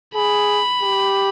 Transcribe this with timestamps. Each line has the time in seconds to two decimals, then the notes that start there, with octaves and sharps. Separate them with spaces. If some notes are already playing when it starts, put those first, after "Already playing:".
0.15 G#4 B5
0.83 G4